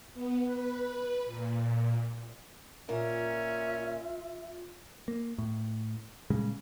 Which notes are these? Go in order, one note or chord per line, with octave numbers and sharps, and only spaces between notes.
B3
B4
A#2
A#2 C#4 F4 A#4 E5
A#3
A2
A#2 C#3 G3 G#3